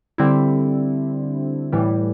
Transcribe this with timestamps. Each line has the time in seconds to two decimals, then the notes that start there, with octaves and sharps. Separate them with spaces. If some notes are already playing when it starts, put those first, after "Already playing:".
0.18 D3 G3 C4 E4
1.73 A2 E3 G3